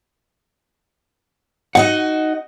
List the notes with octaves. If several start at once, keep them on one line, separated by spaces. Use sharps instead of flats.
D#4 F#4 D#5 F#5